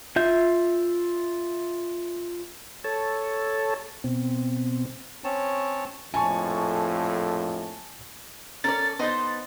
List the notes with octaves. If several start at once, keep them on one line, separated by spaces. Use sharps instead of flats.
F4 E5 G6
A4 C#5 A5
B2 C4
C4 C#4 C#5 A5
A#1 F2 A2 G#5 A5 C#6
C#4 A4 A#4 D5 A6
B3 D#4 C5 D#5 C6